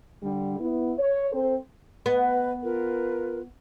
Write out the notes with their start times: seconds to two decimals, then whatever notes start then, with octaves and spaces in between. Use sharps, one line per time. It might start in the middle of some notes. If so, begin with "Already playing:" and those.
0.23 D3 G3
0.60 B3 E4
0.99 C#5
1.32 C4 A4 C5
2.06 B3 B4 D#5
2.62 F4 A#4 B4